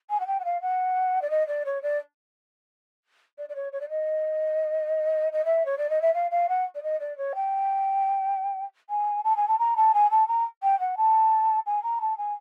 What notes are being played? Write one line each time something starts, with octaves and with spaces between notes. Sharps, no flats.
G#5
F#5
G5
F#5
F5
F#5
D5
D#5
D5
C#5
D5
D5
D5
C#5
C#5
D5
D#5
D#5
E5
C#5
D5
D#5
E5
F5
F5
F#5
D5
D#5
D5
C#5
G5
G#5
A5
G#5
A5
A#5
A5
G#5
A5
A#5
G5
F#5
A5
G#5
A#5
A5
G#5